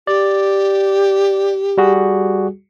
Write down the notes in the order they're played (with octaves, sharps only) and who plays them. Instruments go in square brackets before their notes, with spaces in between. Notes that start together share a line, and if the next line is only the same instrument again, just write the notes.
[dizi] G4 [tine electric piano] D5
[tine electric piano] G3 F#4 G#4